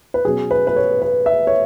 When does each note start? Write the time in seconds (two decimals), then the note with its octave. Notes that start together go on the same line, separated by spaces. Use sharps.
0.14 B4
0.25 B2 F#3 C#4 G#4
0.51 B4
0.67 B4
0.76 C#5
1.02 B4
1.26 E5
1.47 C#5